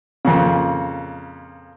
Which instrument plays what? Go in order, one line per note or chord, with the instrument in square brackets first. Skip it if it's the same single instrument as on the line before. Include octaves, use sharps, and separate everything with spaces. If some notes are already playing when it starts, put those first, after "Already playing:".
[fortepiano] F2 A#2 C#3